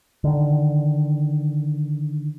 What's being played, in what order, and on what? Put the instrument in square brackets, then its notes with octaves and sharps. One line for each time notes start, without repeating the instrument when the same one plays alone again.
[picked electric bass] D3 D#3